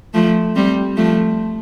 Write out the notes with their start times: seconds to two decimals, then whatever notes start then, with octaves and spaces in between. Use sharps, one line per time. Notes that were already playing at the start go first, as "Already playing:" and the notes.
0.14 F3 A3
0.55 G3 C4
0.97 F3 A3